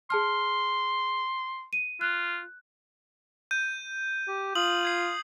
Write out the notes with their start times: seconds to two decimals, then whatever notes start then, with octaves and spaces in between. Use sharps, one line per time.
0.10 G#4 A5 C6 F6
1.73 D#7
2.01 F4 F#6
3.51 G6 D#7
4.28 G4
4.55 F4 D#6 F#7
4.83 G6 G#6 C7